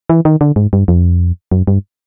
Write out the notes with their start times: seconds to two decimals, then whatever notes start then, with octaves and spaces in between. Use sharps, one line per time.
0.10 E3
0.25 D#3
0.41 D3
0.56 G#2
0.73 G2
0.88 F2
1.52 F#2
1.67 G2